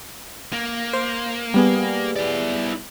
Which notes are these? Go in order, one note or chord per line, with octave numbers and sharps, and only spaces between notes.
A#3
C5
G3 B3 G#4
E4 D5